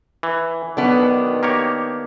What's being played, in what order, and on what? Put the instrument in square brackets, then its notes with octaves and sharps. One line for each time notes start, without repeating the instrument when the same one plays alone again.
[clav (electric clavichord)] E3
[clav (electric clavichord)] B1 B2 [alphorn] D#3 [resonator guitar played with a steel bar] B3 D4
[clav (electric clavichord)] A#3 G4 C#5